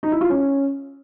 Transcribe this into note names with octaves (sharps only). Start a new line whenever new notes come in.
D#4
E4
F4
C#4